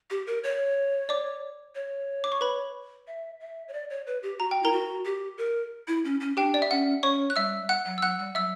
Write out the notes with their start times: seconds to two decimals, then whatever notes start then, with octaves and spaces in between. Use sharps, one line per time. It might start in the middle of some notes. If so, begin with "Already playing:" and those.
0.10 G4
0.27 A#4
0.44 C#5
1.09 D5 D6
1.75 C#5
2.24 D6
2.32 C#6
2.41 B4 B5
3.07 E5
3.40 E5
3.68 C#5
3.73 D5
3.90 C#5
4.07 B4
4.23 G4
4.39 F#4 A#5
4.51 G5
4.62 E4 A#4 A#5
4.72 F#4
5.05 G4
5.38 A#4
5.88 E4
6.05 C#4
6.20 C#4
6.37 D4 G4 G5
6.54 D5
6.62 E5
6.71 C#4 F#5
7.03 C#4 C#5 C#6
7.30 F#6
7.36 G3 E5 E6
7.69 F#5 F#6
7.86 F#3
7.98 E6
8.02 F#3 F#5 F#6
8.19 G3
8.35 F#3 E5 E6